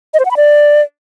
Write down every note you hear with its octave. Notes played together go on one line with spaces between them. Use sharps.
D#5
C5
F#5
B5
D5